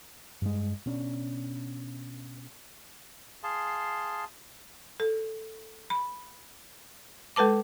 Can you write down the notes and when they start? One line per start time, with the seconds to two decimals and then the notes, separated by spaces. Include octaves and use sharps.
0.42 G2 G#3
0.86 B2 C#4 D4
3.43 G#4 F5 A5 C6
5.00 A4
5.90 B5
7.36 G#3 A4 B4 A5 D6